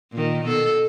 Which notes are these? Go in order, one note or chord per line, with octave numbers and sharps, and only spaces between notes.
A#2 D#3
B2 A4